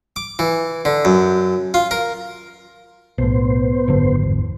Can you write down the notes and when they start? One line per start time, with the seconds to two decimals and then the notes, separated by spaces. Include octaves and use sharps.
0.16 D6
0.39 E3
0.85 D3
1.05 F#2
1.74 F4
1.91 A#4
3.18 B1 A2 B3 C5
3.88 G#1 F#2 D3
4.23 E2